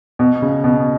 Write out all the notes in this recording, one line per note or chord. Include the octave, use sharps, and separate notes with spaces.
B2
C#3
B2